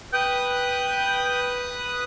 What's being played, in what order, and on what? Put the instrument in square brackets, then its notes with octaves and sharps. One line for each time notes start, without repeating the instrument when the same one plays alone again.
[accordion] B4 D#6 F#6 [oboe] G5